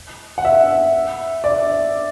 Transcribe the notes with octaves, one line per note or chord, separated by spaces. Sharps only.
F#5
E5
D5